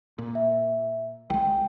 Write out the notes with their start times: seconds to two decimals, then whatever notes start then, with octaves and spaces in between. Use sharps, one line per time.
0.18 A#2
0.35 E5
1.30 C2 G#3 G5